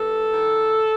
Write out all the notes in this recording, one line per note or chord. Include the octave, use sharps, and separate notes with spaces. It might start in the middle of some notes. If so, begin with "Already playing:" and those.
Already playing: G2 A4
D#3